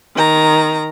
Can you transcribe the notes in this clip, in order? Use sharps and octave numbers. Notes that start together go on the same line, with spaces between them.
D#3 A#5